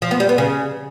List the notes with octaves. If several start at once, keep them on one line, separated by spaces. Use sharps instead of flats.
F3
B3
G3
B3
C#3